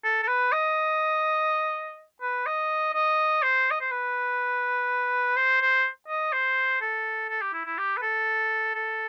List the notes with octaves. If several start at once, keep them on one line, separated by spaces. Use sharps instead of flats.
A4
A4
B4
D#5
B4
D#5
D#5
C5
D#5
C5
B4
C5
C5
D#5
C5
A4
A4
G4
E4
E4
G4
B4
A4
A4